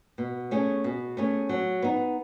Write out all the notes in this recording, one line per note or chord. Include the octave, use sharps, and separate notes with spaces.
B2
A3 C#4 G#4
B2
A3 C#4 G#4
F#3
B3 D#4